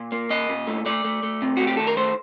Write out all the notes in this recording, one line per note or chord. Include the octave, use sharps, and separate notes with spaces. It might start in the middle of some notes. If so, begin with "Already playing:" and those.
Already playing: A#2
A#3
A#2 D#5
A#2
A3
A3 D5
A3
A3
C3
A3 F#4
G4
D#3 A4
A#4
A3 C5